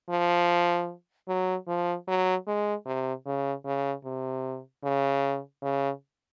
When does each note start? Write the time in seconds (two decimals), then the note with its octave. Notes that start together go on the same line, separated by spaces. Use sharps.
0.10 F3
1.28 F#3
1.68 F3
2.08 F#3
2.47 G#3
2.86 C3
3.26 C#3
3.65 C#3
4.04 C3
4.84 C#3
5.62 C#3